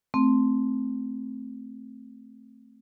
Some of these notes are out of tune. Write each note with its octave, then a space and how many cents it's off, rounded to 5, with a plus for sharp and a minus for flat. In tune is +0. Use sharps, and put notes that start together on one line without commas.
A3 +0 C4 +0